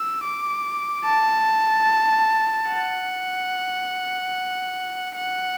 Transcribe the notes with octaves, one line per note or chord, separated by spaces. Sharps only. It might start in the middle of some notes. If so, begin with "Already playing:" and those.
Already playing: E6
D6
A5
F#5
F#5